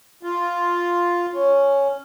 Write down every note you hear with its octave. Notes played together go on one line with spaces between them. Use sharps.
F4
C#4